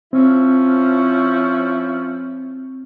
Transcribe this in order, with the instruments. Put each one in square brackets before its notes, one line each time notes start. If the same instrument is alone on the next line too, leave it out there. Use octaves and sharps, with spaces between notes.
[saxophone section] F3 C#4 E4 [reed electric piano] C4